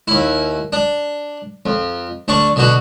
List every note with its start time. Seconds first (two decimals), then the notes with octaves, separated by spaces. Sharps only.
0.08 D#2 E4
0.73 D4
1.66 F2
2.28 D2 D4 D5 C#6
2.56 B2 D3 F#4